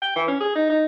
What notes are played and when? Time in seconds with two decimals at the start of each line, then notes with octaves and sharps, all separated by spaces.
0.02 G5
0.16 E3
0.28 C#4
0.40 G#4
0.55 D#4
0.69 D#4